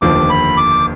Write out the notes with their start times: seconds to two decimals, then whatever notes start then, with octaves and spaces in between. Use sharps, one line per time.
0.02 F1 D#2 D3 F3 D6
0.30 B5
0.57 D6